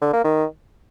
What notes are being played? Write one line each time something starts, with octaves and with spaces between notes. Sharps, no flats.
D3
A#3
D#3